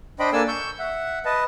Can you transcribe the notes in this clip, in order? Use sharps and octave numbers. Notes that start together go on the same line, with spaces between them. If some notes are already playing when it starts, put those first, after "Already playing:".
D4 C5 D#5 G5 B5
A#3 D4 A4 G#5 A5 E6
C#6 E6 G6
E5 F#5
B4 D#5 A5